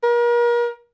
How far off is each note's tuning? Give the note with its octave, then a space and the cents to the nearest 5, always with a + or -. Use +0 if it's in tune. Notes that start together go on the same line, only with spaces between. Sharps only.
A#4 +35